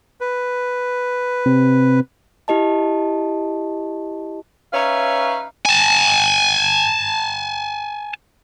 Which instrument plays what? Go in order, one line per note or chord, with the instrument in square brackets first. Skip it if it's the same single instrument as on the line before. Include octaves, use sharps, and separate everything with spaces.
[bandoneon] B4
[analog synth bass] C3
[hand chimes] E4 G4 D#5 A5
[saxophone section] C#4 D#4 B4 C#5 E5 F5
[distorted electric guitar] G#5 A5